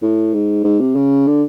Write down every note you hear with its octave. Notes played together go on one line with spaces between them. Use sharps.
A2
G#2
G#2
C3
C#3
D3